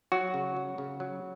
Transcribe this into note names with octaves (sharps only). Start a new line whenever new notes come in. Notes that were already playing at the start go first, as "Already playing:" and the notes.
F#3 F#4
C#3
F#3
C#3
F#3